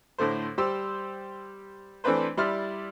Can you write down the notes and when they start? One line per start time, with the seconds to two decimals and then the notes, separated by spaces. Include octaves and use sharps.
0.18 A2 D3 A3 C5
0.58 G3 G4 C5 E6
2.04 E3 A3 C4 D4 B4 C5
2.37 G3 E4 D5 C6 F6